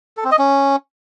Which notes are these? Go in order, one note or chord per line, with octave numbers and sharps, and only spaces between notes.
A4
C4
D#5
C#4